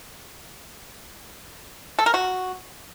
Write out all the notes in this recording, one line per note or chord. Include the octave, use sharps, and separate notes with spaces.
A4
A#4
F#4